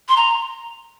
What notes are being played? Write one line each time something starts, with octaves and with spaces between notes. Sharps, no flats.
C6
A#5